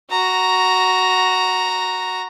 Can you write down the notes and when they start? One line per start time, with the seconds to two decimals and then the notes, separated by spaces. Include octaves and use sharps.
0.10 F#4 A#5